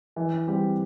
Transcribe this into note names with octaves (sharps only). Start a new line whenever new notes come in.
E3
G3 C4 G4